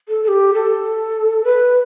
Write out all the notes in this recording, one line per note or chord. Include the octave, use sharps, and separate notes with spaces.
A4
A4
G4
A4
B4